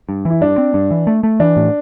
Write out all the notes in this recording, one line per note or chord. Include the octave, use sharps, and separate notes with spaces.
G2
E3 E4
G2 D4
C4
G2
E3
A3
A3
E3 D4
A2